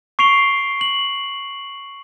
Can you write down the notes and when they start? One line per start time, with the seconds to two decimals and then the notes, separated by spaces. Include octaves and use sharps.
0.19 C#6 C7 D7 F7 G7
0.81 F#7